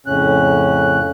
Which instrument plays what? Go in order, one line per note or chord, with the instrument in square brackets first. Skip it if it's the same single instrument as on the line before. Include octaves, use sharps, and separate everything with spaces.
[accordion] F2 A2 C#3 C#4 F#6